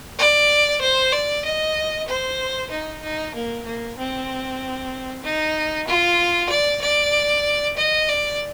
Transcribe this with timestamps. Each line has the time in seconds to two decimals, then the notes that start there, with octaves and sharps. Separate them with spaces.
0.19 D5
0.81 C5
1.12 D5
1.45 D#5
2.08 C5
2.71 D#4
3.02 D#4
3.34 A#3
3.65 A#3
3.98 C4
5.23 D#4
5.88 F4
6.50 D5
6.82 D5
7.77 D#5
8.09 D5